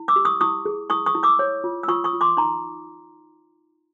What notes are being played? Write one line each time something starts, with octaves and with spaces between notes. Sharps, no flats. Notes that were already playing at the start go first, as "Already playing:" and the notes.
Already playing: E4
D6 E6
G4
C#6 D#6
E4 C#6 D#6
G#4
E4 C#6 D#6
C#6 D#6
E4
D6 E6
C#5
F4
E6
F4 C#6 D#6
C#6 D#6
F4
C6 D6
D#4 A#5 C6